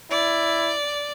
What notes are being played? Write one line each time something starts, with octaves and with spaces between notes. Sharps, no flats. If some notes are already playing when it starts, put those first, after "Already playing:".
E4 D5